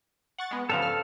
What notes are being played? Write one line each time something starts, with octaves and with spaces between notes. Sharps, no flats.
F#5 C#6 A6
G#3 B3
G2 C#3 F3 A4 F5
F6